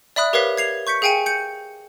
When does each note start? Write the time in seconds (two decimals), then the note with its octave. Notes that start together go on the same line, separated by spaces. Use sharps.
0.16 D5 E5 B5 D#6 F#6
0.33 G4 A#4 B4 C#5 F5 B6
0.57 G#6 C7 F7
0.87 C#6 G6 B6 C#7
1.02 G#4 F5 G5 G#5 C#7
1.26 G6 C#7